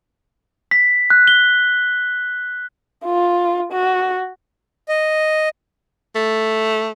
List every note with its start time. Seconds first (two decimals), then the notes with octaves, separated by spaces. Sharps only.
0.71 B6
1.10 F#6
1.28 G7
3.05 F4
3.72 F#4
4.89 D#5
6.15 A3